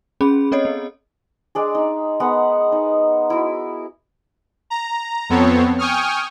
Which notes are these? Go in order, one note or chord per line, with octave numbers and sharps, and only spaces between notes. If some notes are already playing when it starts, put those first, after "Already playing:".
C#4 G#4 B5
C4 A4 C#5 D#5
B3
G#3 D4 G#4
D#4
G#3 B3 A#4 F#5
D#4
E4 F#4
A#5
F2 B3 C4 A4 C#5
G5 G#5 C#6 D#6 F6